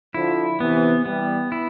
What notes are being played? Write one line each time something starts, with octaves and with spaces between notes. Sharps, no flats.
D3 F3 E4
C3 E3 B3
E3 G3 B3
E4